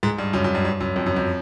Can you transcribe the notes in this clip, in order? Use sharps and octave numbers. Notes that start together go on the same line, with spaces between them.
G#2
G2
F#2
F#2
G2
G2
F#2
F2
F#2
F2